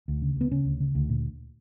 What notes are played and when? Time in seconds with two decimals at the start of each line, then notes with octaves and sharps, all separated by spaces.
0.08 D2
0.22 C#3
0.36 D2 B3
0.51 C#3 C#4
0.65 D2
0.80 C#3
0.95 D2
1.10 A#2